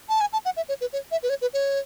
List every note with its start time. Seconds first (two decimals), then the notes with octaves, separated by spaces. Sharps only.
0.09 A5
0.21 G#5
0.33 A5
0.45 F#5
0.57 E5
0.69 C#5
0.81 B4
0.93 C#5
1.11 E5
1.23 B4
1.29 C#5
1.42 B4
1.54 C#5